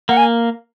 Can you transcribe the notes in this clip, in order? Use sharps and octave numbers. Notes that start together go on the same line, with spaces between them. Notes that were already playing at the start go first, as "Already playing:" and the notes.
A#3 F#5
G#5